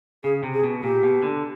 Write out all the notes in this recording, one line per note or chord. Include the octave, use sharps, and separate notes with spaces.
C#3 G#4
C3
G#4
B2
A#2 G4
B2
D3